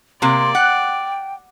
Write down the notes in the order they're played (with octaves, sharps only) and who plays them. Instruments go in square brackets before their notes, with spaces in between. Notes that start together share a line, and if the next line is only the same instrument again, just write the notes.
[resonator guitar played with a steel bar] C3 A#3 [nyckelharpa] D5 [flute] C6
[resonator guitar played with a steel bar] F#5 [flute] G5